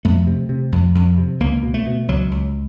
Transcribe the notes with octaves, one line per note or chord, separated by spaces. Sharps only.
F2 A3
C3
C3
F2
F2
C3
C#2 A#3
B2
A3
B2
C#2 F#3
C#2